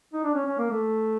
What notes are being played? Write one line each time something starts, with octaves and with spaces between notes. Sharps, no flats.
D#4
D4
C#4
C#4
A#3
A3